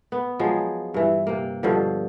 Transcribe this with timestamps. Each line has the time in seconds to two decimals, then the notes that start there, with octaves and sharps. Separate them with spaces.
0.12 B3
0.40 F3 F#3 G#3
0.94 G2 E3
1.27 C3 A#3
1.63 G2 B2 D3 F3